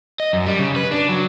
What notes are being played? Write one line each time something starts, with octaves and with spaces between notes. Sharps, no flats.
D#5
F#2
G3
C#3
B4
D4
F#3